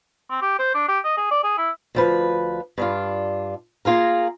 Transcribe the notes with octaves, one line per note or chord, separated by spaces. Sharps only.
C4
G4
C5
D4
G4
D#5
G#4
D5
G#4
E4
D2 F3 B4
G2 D4 F4
A#3 F4 G#4 A#4